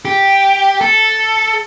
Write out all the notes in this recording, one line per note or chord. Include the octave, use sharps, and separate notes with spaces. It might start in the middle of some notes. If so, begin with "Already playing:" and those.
G4
A4